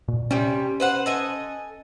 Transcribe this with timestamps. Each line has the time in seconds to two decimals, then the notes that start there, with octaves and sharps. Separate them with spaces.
0.08 A#2
0.31 C3 G3 C#4
0.80 B4 C5 F#5
1.06 A4 D#5 G#5